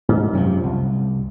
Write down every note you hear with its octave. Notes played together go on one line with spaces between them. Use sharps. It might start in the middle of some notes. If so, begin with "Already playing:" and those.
G#2
F#2 C3 D#3 F3
C2